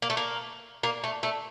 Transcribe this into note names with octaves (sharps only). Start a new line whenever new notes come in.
A#3
A3
A#3
A#3
A3
A3